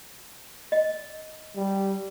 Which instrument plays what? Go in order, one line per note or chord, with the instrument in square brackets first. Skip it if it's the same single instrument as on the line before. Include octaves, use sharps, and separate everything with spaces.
[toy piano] D#5
[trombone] G3